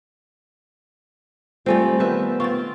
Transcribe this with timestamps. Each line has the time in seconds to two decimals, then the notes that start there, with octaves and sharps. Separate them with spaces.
1.66 G3 A3 C4 F4 C5 G#5
1.99 D#3 B3 B4 E5
2.40 C4 F4 C#6 A6